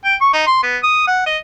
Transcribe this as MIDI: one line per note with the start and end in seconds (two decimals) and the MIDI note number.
0.05 0.15 79
0.21 0.30 85
0.33 0.45 63
0.47 0.58 84
0.63 0.77 59
0.83 1.03 87
1.07 1.23 78
1.26 1.37 75